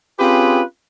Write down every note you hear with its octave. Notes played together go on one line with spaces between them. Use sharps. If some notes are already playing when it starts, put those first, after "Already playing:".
C4 C#4 F4 G4 G#4 B4